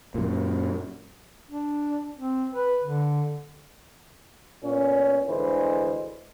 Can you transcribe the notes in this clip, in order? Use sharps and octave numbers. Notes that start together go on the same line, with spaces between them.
F#2 A#2
D4
C4
B4
D3
A#2 B3 C#4
D2 D3 E3 G#3 C5